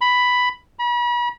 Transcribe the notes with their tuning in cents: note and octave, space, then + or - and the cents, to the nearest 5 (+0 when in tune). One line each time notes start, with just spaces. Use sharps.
B5 +5
B5 -40